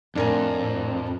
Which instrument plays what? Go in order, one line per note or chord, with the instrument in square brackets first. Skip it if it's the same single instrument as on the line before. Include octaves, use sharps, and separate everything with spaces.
[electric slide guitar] F2 [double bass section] A2 [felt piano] D4 A#4 G#5